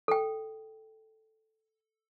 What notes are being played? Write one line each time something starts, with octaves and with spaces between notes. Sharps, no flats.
A4 G5